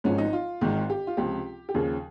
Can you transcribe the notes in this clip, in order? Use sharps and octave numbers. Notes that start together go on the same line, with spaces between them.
G#1 G#2 F3 C#4
D#4
F4
G#1 G#2 D#3
G4
F4
C#2 C3 F3 G4
G4
D#2 C#3 F3 G#4